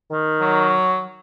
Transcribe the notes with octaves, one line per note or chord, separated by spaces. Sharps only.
D#3
F#3